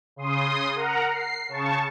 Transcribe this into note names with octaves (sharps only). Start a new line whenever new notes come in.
C#3 C6 D#6
A#4 F#5 A#5
C7
C#3 A5 C#6